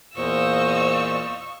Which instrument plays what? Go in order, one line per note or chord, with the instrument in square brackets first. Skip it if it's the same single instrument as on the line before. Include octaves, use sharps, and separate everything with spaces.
[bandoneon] E2 A#2 [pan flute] C5 [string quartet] D#5 F5 E6 [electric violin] C#6